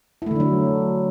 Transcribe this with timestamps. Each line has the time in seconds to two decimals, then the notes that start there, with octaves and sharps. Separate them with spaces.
0.22 E4
0.26 A3
0.31 D3
0.35 D4
0.40 F#3